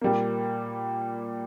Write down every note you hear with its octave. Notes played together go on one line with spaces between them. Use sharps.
A#2 G3 A#3